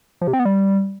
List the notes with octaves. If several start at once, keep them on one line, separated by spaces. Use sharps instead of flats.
F3
C3
C4
B3
G3